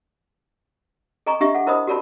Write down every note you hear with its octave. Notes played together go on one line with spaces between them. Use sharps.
A4 D#5 G#5 A#5 C#6
D4 G4 D#5 E5 C#6
A4 F#5
E4 A#4 C5 D#5 B5 D#6
F#4 G4 A#4 D5 A5 B5